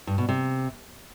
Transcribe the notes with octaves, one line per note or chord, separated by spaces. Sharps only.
G2
B2
C3